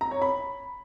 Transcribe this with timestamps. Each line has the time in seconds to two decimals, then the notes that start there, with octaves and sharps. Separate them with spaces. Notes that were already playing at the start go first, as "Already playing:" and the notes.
0.01 A#5
0.11 C#5
0.22 B5